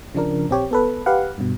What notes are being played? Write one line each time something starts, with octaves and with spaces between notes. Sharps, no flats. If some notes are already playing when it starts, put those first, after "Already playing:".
C#3 F3 D4 A#4
A#1 C4 G4 C#5
B3 A4 B4
G4 B4 F5 F#5
G2 B2